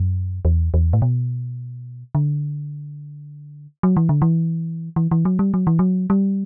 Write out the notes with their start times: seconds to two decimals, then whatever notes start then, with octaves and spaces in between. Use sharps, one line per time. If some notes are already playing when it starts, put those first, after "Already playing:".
Already playing: F#2
0.45 E2
0.74 E2
0.93 A2
1.02 B2
2.15 D3
3.83 F#3
3.97 E3
4.09 D3
4.22 E3
4.96 E3
5.11 E3
5.25 F#3
5.39 G3
5.54 F#3
5.67 E3
5.79 F#3
6.10 G3